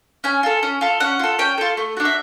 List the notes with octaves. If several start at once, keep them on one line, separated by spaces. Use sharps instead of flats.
C#4 G#5
F4 A4
C#4
F4 A4
C#4 F#5
F4 A4
C#4 G5
F4 A4
A3
D4 F#4
E5